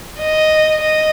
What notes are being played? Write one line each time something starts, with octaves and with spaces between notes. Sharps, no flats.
D#5
D#5